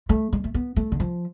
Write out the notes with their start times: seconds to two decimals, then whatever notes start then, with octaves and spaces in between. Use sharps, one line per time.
0.09 A3
0.33 G#3
0.44 A3
0.54 B3
0.76 A3
0.92 D3
1.00 F3